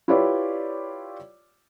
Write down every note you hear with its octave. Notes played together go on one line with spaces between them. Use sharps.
E4 F4 G4 B4 C#5 D5